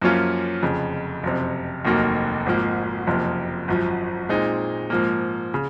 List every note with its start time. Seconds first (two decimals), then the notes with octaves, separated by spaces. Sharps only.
0.02 F#2 F3 A#3 C#4 F4
0.62 F1 F2 C#3
1.23 F#1 F2 C3
1.85 F1 D#2 D#3 F#3 A#3
2.46 G#1 G#2 F3 A#3
3.07 F#1 F2 C3 F3 A#3
3.68 G#1 F#2 F3
4.29 A#2 G#3 C4 D#4
4.90 G#2 F3 A#3
5.54 C#3